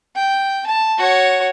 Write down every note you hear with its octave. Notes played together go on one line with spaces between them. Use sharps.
G5
A5
F#4 C#5